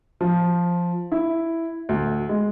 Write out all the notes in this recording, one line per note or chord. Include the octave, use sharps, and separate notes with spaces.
F3
E4
D2
G#3